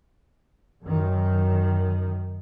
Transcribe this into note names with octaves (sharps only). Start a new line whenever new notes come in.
F#2 D#3